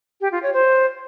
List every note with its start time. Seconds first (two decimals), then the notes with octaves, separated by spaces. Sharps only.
0.21 G4
0.32 F4
0.43 C#5
0.54 C5